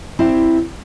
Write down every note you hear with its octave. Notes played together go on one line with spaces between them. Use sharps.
C4 E4 G4 D5